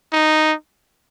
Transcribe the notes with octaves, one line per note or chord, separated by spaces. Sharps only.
D#4